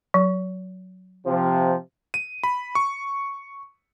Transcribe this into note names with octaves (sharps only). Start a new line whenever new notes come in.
F#3
C3 F3
D#7
B5
C#6